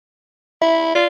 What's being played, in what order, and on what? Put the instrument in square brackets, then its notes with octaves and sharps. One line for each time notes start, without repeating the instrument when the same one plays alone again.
[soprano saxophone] E4 [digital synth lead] E5
[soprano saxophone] F4 [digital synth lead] D5